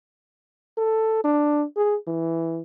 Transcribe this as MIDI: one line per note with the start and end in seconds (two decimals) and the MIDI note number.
0.78 1.19 69
1.24 1.64 62
1.76 1.96 68
2.07 2.61 52